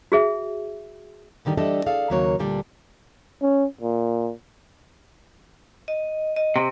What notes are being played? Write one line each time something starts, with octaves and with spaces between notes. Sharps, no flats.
F#4 G#4 E5
G#2 D3 D#3 G3
E3 G3 D4 A4 D#5 E5
G#4 A4 D5 F5
D#2 C#3 F#3 A#3 C#5
D2 A#2 D3 G3 D4
C#4
A#2
D#5
D#5
C3